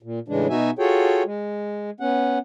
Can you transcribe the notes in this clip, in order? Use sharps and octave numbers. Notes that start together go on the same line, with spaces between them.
A#2
A2 C#3 E3 G#3 D4
B2 B3 D#4 F#4 E5 G#5
F4 F#4 G#4 A4 C#5 G5
G#3
B3 C#4 F#5